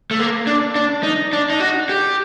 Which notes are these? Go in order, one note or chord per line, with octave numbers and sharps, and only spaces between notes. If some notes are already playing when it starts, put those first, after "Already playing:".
A3
A#3
D4
D4
D#4
D4
D#4
F#4
G4